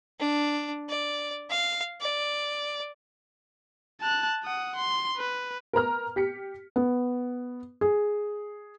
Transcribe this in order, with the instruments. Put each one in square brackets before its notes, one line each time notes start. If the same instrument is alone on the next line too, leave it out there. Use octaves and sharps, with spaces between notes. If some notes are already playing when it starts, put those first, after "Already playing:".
[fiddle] D4
D5
F5
D5
[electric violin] A5 F#6
F#5 D#6
C6
B4
[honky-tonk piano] A#4 B4 A#5 F6
G4 B6 C#7
[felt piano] B3
G#4